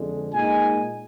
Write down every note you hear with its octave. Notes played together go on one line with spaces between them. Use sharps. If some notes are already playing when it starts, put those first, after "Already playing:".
Already playing: F2 D3 G#3
A#2 G#3 D#4 G#5